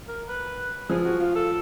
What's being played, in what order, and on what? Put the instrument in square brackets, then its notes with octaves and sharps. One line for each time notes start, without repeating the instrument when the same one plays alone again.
[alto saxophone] A#4
B4
[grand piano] F3 [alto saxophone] G#4
[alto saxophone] F#4
F4
A4